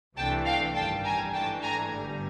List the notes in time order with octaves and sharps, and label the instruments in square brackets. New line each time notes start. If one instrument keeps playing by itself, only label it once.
[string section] C2 C3 E3 A3 D4 G5 A5
F5 G5
A1 G2 D#3 G3 G5 A5
G#5 A#5
G#2 E3 A3 D4 G5 A5
G#5 A#5
G1 G2 D3 G3